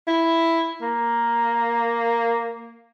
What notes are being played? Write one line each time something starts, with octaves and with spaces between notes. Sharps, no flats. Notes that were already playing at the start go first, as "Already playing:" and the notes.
E4
A#3